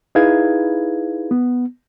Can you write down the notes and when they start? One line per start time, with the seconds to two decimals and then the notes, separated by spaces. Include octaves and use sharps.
0.15 D#4 E4 G#4 B4 F5 G#6
1.31 B3